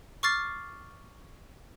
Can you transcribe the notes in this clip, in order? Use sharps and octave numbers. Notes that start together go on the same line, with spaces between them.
C#6 D6 F6 A6 C7